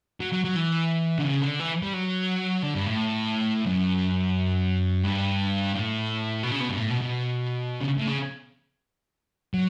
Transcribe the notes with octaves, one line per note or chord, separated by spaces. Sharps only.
F#3
F#3
F#3
E3
D3
C#3
D3
E3
G3
F#3
D3
G2
A2
F#2
G2
A2
B2
C#3
B2
G2
A2
B2
B2
C#3
A2
C#3
F#3